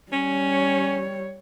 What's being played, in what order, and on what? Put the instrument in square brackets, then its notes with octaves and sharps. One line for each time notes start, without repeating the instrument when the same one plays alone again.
[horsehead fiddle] G3 C#5 [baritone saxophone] C#4